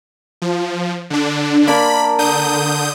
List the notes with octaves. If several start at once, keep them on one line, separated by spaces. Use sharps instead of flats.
F3
D3 D4
A#3 D4 A#4 B5
D3 D#6 G6